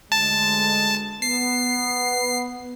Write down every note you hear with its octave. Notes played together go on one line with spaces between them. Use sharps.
D2 G#3 A5
B3 C7